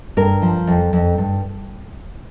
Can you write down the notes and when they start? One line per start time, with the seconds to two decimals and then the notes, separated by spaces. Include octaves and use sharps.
0.17 G2 A#4
0.42 F3
0.67 F2
0.93 F2
1.18 G2